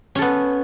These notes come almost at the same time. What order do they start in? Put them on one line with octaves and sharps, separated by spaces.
C#4 A4 B3